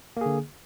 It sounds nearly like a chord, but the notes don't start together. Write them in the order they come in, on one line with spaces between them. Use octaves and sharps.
A#3 G#4 D3